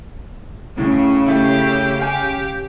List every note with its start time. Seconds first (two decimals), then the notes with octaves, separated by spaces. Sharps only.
0.78 A2 C#3
1.27 A3 E4 G4
1.99 G4 F5 G#5